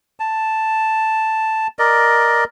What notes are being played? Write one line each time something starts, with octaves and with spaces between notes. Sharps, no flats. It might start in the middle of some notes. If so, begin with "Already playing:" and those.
A5
A#4 D5 D#5